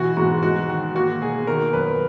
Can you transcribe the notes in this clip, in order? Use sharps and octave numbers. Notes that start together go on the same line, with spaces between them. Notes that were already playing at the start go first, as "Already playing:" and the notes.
Already playing: B2 E3 F#4
G#2 F#4
G#3 F#4
D#3 F#4
A#3 F#4
B2 G#4
D#3 A#4
F#2 B4